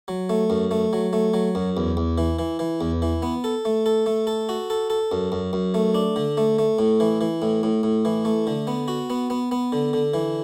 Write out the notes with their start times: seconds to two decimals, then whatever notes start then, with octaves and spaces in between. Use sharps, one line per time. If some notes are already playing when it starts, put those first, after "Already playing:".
0.08 F#3
0.29 A3
0.50 F#2
0.71 A3
0.93 F#3
1.13 A3
1.34 F#3
1.55 F#2
1.77 E2
1.97 E2
2.18 E3
2.39 E3
2.59 E3
2.81 E2
3.02 E3
3.22 B3
3.44 A4
3.65 A3
3.86 A4
4.06 A3
4.27 A4
4.49 F#4
4.70 A4
4.90 A4
5.12 F#2
5.32 F#2
5.53 F#2
5.74 A3
5.94 D4
6.16 D3
6.37 A3
6.59 A3
6.79 A2
7.00 E3
7.21 E3
7.42 A2
7.63 A2
7.83 A2
8.05 E3
8.25 A3
8.47 D3
8.67 B3
8.88 F#4
9.10 B3
9.30 B3
9.51 B3
9.72 D3
9.93 D3
10.14 E3